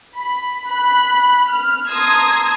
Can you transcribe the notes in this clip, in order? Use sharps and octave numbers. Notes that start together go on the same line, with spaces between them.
B5
B5 F#6
F6
A5 A#5 C6 D#6 E6 G#6